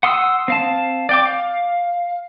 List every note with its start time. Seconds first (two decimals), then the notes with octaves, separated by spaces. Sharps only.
0.03 F#5 C6 D#6 E6
0.48 C4 F5 A5
1.09 D5 G5 D6
1.26 F5